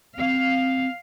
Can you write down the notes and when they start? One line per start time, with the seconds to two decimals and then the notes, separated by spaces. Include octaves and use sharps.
0.18 C4 F5